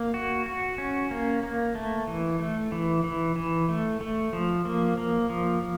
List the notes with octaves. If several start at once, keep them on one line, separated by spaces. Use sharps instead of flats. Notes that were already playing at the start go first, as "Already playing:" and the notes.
Already playing: A#3
F#4
F#4
C#4
A#3
A#3
A3
E3
A3
E3
E3
E3
A3
A3
F3
A#3
A#3
F3